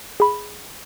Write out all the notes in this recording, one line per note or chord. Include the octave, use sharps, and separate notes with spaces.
G#4 B5